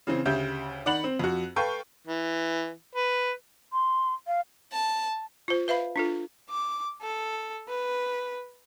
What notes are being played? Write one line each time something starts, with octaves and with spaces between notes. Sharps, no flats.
C#3 E3 C4
D2 C#3 G4 E5 G6
D#3 D5 F#5 B5 F#7
C4
F2 F#4
A4 B4 F5 G5 C#6 G6
E3
B4
C6
F5
A5
F4 C5
B4 E5 F5 B5
D4 F4 A4
D6
A4
B4